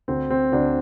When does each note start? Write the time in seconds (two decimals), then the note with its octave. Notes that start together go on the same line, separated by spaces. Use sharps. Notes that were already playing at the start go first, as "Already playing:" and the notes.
0.08 D2 C4
0.30 C4
0.52 D2 D4